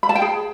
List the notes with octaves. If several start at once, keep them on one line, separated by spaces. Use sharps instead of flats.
B5
A5
G5
G#4